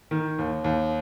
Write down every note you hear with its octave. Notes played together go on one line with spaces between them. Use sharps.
D#3
D#2
D#2